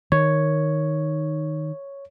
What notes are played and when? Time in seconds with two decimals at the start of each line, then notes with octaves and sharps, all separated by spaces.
0.12 D#3 C#5